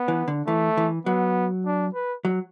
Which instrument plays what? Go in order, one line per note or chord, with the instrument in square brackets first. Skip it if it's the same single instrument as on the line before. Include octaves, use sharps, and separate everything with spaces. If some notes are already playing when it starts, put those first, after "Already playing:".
Already playing: [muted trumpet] B3
[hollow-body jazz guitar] E3
D3
[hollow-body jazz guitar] E3 [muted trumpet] A3
[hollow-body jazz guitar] E3
[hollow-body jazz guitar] F#3 [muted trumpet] B3
[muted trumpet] D4
B4
[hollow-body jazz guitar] F#3